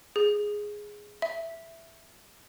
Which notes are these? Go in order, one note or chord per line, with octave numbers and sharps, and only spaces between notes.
G#4
E5